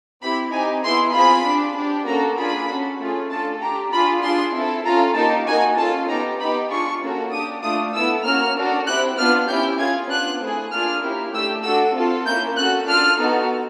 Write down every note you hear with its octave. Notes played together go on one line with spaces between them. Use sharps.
C4 E4 G4 B5
C4 D#4 G4 G#5
B3 E4 G#4 C6
C4 F4 G#4 B5
D4 G4
D4 G4
A#3 C#4 F#4 A4 A#5
D4 F4 G#4 B5
C#4 F#4 A4
A3 C#4 F4 G#4
D4 F4 A4 A5
D4 G4 A#5
D4 F4 G#4 B5
D4 F4 G#4 C6
C4 E4 A4
C#4 F4 A4 A#5
A#3 D#4 G4 A5
A#3 D#4 F#4 G#5
C#4 F4 A4 A5
B3 D#4 G4 A#5
B3 D#4 G4 B5
D4 F4 G#4 C#6
A#3 C#4 F#4 A4
D4 G4 D#6
A3 D4 F4 D#6
B3 E4 A4 E6
A#3 C#4 F#4 F6
D4 F#4 A4
C4 E4 G4 F#6
B3 D4 F4 F6
C#4 E4 G4 G6
C#4 F4 G#4 G#6
B3 D4 F4 F#6
A3 C4 E4 G#4
A#3 D4 F4 G#4 F6
A#3 C#4 E4 G4
A3 D4 G4 E6
D4 F#4 A4 E6
C4 F4 A4
A#3 C#4 E4 G6
C#4 F#4 A4 F#6
D4 F4 A4 F6
B3 D#4 F#4 A4